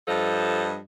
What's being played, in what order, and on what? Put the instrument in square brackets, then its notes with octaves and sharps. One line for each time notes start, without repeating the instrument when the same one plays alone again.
[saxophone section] G2 F3 A4 D#5